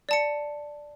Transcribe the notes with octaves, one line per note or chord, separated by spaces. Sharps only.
D5 A5 C#7